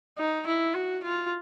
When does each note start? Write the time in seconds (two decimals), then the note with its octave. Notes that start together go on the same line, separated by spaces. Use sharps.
0.18 D#4
0.47 E4
0.74 F#4
1.04 F4